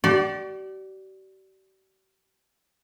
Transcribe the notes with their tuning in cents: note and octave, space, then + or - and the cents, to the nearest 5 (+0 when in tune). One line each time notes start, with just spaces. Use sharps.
G4 -45 D5 +0